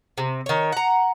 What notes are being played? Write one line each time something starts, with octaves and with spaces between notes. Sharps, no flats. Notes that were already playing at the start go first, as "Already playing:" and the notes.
C3
D#3 C#5
F#5 A#5